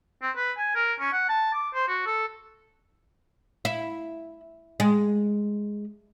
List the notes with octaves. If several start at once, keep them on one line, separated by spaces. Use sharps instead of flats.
C4
B4
G#5
A#4
C#4
F#5
A5
D6
C5
F#4
A4
E4
G#3